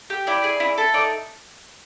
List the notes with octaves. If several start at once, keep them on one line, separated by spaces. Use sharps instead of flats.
G4
E4 D5
G#4
E4
A4
D#4 D5